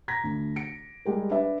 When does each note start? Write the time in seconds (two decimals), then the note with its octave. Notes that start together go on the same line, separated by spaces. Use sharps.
0.08 A#5 G#6 A#6 B6
0.24 D2
0.56 C#7 D7
1.05 G3 G#3 G4 A#4
1.31 D4 B4 E5